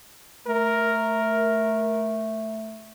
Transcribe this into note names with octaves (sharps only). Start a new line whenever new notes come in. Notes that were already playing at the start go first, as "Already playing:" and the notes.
A3 A#4